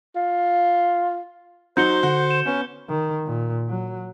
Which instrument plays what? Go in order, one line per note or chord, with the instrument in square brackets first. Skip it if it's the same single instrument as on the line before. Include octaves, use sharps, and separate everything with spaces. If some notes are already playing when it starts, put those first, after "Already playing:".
[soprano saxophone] F4
[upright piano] F#3 D#4 F#4 [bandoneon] C5 [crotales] G6 C#7 G7
[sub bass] D3 [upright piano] F#4
[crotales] E7
[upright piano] B3 [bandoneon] C#4
[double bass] D#3
A#2
F#3